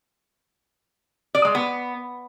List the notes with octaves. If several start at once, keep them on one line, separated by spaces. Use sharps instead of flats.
D5
G#3
B3